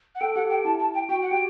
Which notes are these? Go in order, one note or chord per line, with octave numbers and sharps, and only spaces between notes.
F#5
A4 G5
G4 F#5
G4 G5
E4 A5
A5
G5
F#4 G5
F#5
G4 G5